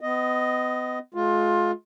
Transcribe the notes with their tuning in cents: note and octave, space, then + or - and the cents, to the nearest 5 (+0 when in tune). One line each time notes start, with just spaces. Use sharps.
B3 +35 D#5 +0
G#3 +40 F4 +20